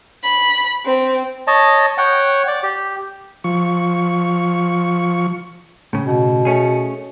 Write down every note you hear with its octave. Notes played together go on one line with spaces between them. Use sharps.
B5
C4
C#5 D#5 A5
C#5 F#5 G5
D5
G4
F3 C#6
A2 C#3
B2
A3 C#4 G#4